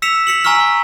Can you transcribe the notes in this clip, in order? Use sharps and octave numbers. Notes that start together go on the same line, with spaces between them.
E6 B6 C#7 E7 F7
B6 C#7 F#7
G#5 A#5 C#6 E6 F6 B6